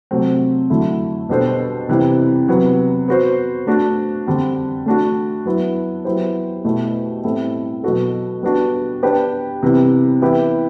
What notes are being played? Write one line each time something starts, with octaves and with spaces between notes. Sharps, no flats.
C3 F#3 A3 C4
D3 F#3 A3 E4
B2 G3 D4 A4 C5
C3 E3 G3 C4
C3 F#3 B3
B3 F#4 C5
A3 D4 F#4
D3 G3 C4
A3 D4 F#4
F#3 B3 E4
F#3 B3 E4 G4 C5
B2 A3 E4 G4
A2 G3 C4 E4 A4
B2 F#3 B3 F#4 A4
G3 B3 D4 F#4
B3 D4 G4 B4 D5
C3 E3 G3 B3
E3 B3 E4 G4